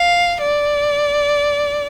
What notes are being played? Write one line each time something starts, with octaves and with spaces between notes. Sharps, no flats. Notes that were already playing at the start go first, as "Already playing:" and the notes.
Already playing: F5
D5